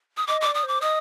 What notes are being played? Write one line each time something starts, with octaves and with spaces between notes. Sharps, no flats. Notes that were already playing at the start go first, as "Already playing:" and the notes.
D#6
D#5 D6
D5 D6
D#6
C5 D6
D#5 D#6